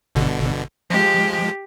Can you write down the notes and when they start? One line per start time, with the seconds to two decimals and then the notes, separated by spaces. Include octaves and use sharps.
0.15 G1 B2 D3
0.90 F3 G#3 G4